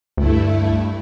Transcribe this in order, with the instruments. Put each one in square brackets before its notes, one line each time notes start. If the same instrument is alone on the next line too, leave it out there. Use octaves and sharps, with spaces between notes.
[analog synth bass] D2 [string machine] G2 A3 E4